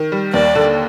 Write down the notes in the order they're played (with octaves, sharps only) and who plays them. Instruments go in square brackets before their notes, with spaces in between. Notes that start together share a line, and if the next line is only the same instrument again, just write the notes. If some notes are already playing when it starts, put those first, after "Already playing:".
Already playing: [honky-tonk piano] D#3
G3
[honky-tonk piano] D#2 [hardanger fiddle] D5
[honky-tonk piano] D3